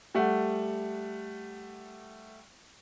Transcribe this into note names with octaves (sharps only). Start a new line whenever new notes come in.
G3 A3 F#5